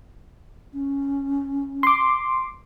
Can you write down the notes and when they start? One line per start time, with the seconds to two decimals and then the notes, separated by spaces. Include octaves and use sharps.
0.73 C#4
1.83 C6 D6